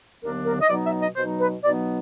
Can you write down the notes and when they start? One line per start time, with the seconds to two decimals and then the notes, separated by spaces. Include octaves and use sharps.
0.23 D#2 D3 F#3 B3 D4 A#4
0.46 A#4
0.61 D#5
0.69 B2 F#3 B3 D#4 D5
0.85 E5
1.02 D#5
1.16 B2 F#3 B3 D#4 C5
1.40 B4
1.64 B2 F#3 B3 D#4 D5